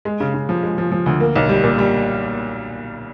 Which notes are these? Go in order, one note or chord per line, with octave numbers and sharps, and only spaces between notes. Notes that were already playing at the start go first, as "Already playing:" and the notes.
G#3
C#3
C#3
F3
G#3
F3
F3
D2
A#3
B1
G3
A#2
G3